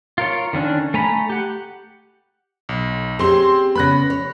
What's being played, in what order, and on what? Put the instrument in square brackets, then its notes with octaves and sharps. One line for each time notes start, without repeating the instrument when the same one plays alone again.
[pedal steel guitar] F4 A#4 C#5
D3 D#3 C#4 D4
A3 G#5 A#5 B5
G4 F#5
[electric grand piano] B1
[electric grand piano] C4 C6 [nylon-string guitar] C#4 G4 G#4
[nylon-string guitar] C#3 B3 [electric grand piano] B5 F#6 A#6
[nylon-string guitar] C#5